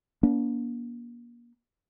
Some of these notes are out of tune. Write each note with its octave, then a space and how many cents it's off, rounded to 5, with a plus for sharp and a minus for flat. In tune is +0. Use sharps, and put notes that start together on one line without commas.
A#3 +35 D4 -45